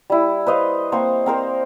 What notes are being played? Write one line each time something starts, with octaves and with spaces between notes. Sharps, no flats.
G3 E4
B4 C5 D#5 F5
A#3 C4 C5 C#6
C4 A#4 C5